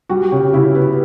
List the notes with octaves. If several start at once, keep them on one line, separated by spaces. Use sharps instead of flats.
G3 F#4
C#3 G4
C#3 E4
B3